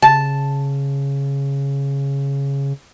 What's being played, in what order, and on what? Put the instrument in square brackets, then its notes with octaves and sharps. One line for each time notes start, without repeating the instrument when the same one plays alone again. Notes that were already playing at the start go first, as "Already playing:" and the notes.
[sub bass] C#3 [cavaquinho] A5